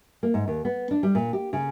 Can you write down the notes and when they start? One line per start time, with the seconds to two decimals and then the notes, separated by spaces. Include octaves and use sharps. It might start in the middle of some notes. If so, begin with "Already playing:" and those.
0.23 A#3
0.34 G#2
0.48 D#2
0.65 B3
0.91 D4
1.03 G3
1.15 A#2
1.33 G4
1.53 C#3